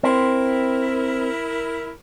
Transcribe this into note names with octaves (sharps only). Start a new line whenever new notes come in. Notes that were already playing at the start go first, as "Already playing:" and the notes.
C4 E4 A#4